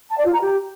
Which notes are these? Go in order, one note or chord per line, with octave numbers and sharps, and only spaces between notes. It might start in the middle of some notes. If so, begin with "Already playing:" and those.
A5
D5
F4
A#5
G4